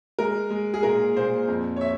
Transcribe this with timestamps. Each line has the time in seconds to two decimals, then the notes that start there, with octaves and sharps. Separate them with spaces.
0.19 G#3 A#4
0.50 G#3
0.74 G#4
0.83 A#2 A#4
1.17 A#2 C5
1.48 F2
1.76 C#5
1.81 E5